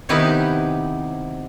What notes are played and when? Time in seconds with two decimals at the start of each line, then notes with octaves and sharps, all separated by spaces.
0.09 C3 D#3 B3 D#4 E4 G4